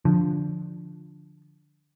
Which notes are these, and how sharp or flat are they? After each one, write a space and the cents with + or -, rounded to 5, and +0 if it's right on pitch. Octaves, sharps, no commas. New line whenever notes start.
D3 +0 F3 +0